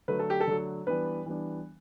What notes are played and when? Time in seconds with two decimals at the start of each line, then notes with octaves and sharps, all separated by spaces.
0.08 D3 F#3 A3 B4
0.19 A4
0.30 G4
0.41 A4
0.47 D3 F#3 A3
0.87 E3 G3 B3 D4 B4
1.26 E3 G3 B3 D4